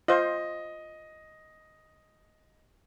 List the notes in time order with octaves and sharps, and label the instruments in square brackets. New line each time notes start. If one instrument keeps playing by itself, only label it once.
[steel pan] F4 C5 [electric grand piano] D#5